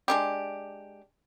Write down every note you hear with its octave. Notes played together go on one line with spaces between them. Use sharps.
G#3 D4 G4